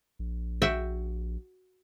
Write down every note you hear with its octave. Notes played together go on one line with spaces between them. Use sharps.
A#1
F#4 E5 G5